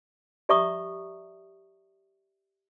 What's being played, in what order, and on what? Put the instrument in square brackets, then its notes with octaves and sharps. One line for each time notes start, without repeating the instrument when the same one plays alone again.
[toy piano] G4 D5 E5 A#5 C#6 D#6